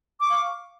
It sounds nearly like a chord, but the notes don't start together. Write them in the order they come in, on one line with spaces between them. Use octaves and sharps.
D6 C#6 F5